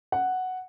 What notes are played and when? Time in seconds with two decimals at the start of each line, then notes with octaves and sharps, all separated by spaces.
0.12 F#5